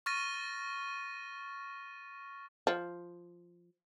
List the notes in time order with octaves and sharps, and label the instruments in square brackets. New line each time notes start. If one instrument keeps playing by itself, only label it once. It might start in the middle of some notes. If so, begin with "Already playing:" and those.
[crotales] C#6 F6 A6 A#6 D#7
[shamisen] F3